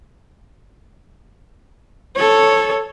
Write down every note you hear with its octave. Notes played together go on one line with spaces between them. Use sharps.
A4 C#5